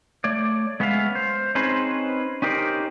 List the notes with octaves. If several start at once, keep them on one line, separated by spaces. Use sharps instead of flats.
A3 C#5 D5
G#3 B3 C#4 E5 F5
C5
C4 C#4 D#4 G#4 B4 C5
C#4 D#4 G4 A#4 C5 D5